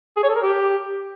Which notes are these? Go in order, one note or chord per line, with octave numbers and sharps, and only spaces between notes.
G#4
C#5
A4
A#4
G4